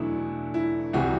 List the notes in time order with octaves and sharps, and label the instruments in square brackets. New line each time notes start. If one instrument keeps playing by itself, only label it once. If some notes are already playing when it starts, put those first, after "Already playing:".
Already playing: [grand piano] E2 B2 F#3 A3 D4 E4
E4
C2 C3 E3 G3 F#4